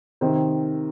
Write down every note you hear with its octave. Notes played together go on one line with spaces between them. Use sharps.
C3 D#3 C4